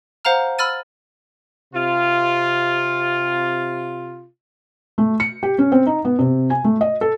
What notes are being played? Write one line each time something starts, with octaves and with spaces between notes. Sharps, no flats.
C5 F5 F#5 A#5 F6
B5 E6 F6 A6 D#7
C3 F4
A3
C#7
G4
C#4
C4
D#4
B3
C3
G#5
A3
D#5
A4